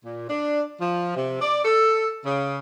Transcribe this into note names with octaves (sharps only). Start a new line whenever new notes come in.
A#2
D4
F3
C3
D5
A4
C#3